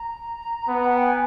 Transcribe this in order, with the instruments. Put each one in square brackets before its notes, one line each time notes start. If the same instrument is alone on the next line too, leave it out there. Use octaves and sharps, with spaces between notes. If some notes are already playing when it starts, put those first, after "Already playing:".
Already playing: [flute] A#5
[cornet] B3
[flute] F#5
G5
G#5